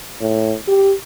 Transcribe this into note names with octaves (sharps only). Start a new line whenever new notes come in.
A2
G4